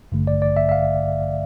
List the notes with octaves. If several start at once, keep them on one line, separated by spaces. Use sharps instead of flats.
A1 G2 D3 A3
D5
D5
E5
E5
F5